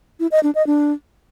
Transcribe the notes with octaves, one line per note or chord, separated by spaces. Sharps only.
E4
D#5
D4
D#5
D4